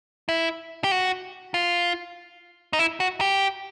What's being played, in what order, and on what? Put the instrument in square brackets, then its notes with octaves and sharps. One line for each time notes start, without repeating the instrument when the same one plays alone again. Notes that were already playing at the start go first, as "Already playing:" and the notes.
[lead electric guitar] E4
G4
F#4
F4
D#4
E4
F#4
G4